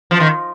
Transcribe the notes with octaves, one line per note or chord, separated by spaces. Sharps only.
F3
D#3